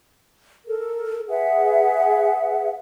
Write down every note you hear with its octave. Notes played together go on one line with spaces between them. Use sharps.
A4 A#4
G#4 B4 E5 F#5